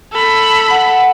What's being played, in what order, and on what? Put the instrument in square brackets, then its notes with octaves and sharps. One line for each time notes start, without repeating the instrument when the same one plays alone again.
[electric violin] A4 B5
[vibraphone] F#5